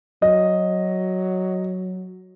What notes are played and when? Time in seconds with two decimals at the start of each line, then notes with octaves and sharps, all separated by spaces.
0.22 F#3 D#5